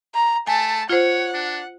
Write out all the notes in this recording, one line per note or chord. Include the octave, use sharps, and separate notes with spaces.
A#5
A3 G#5 A5
F4 C5 C#5 F#5
D4